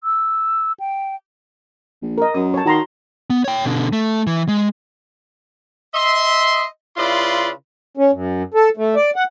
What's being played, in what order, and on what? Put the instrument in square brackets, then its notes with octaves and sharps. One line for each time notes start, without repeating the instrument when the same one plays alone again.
[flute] E6
G5
[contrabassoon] A#1
[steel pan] A#4 D#5
[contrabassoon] F#2 [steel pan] D#6
[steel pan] C#5 A5
[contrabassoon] D#3 [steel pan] F#4 A#5 C6
[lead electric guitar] B3
C#5 G5
B2 D3
A3
E3
G#3
[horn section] D#5 E5 C6
C#3 E4 F4 B4 D5 C6
[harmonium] C#4
F#2
A4
A3
D5
F#5